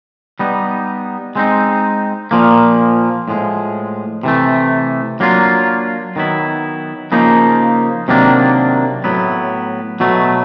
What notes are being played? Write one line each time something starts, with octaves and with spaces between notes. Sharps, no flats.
G3 B3 D#4
G#3 C4 D#4
A#2 F3 A#3
A2 F3 G#3
C3 E3 A3
F#3 A#3 D4 F4
D#3 F#3 B3 E4
C#3 F3 A#3 D#4
C3 D#3 F#3 A#3 D4
A2 F#3 B3 E4
B2 F#3 A3